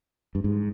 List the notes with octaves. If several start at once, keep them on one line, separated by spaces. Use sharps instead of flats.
G2
G#2